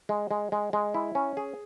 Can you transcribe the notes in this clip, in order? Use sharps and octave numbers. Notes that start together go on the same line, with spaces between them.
G#3
G#3
G#3
G#3
E4
C#4
G#4